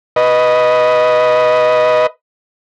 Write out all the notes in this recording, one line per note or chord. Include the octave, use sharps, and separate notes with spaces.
B4 D#5